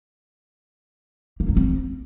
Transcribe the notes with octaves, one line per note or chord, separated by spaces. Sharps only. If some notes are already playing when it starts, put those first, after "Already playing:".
A#3
F#3
C4